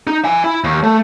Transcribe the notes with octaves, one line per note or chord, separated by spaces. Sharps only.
D#4
E5 G#5
E4
D#2
A3